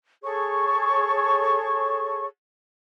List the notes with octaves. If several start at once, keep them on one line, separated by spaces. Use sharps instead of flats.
G#4 A4 C#5 C#6